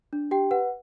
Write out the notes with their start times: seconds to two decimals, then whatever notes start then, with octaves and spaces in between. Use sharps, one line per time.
0.13 D4
0.31 G4 G5
0.51 B4 F#5